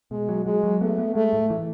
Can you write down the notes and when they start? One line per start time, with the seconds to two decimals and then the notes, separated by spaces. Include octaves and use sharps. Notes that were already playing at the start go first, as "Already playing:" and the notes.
0.11 B2 G#3
0.29 F#3
0.45 F#3 G#3
0.63 F#3
0.81 A3 B3
0.98 B3
1.15 G#3 A3
1.33 A2
1.50 E3